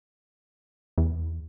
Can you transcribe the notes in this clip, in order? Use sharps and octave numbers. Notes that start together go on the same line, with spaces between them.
E2